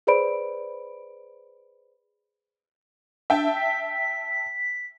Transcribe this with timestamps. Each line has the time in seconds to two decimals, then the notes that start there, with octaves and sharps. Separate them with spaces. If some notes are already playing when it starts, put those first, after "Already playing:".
0.07 G#4 B4 C5 D5 B5 D7
3.30 D4 E5 G5 A5
3.56 B6